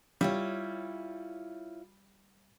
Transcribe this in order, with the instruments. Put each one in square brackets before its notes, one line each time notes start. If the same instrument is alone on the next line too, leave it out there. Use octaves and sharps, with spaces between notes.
[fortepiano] G3 [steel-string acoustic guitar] E4 F4 C#5